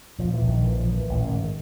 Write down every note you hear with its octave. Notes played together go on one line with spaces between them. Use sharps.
A#2 F3
E3
A#1
D#3
A#2 E3
F3
A#2
E3
A1 E3
D#3
G#2
D#3